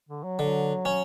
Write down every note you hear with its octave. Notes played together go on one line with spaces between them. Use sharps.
D3
F#3
D3 F#3
C#4